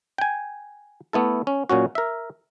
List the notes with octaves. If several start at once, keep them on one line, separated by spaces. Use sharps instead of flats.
G5 G#5
A3 B3 E4 A4
C#4
A#2 F#3 C#4 F#4
A#4 E5